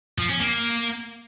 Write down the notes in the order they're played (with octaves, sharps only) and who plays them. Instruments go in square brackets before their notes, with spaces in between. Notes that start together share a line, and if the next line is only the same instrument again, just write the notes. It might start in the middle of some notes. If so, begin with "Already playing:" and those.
[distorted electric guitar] F3
C#4
A#3